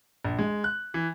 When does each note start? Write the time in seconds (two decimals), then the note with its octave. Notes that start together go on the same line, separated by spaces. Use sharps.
0.25 A#1
0.39 G#3
0.64 F#6
0.94 E3